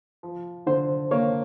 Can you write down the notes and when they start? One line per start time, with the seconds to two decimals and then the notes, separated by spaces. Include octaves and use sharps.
0.23 F3
0.66 D3 C5
1.11 A#3 C#5